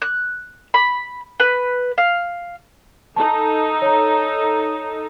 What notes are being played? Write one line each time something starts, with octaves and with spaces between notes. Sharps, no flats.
F#6
B5
B4
F5
D#4 A4 A5
C#5 A#5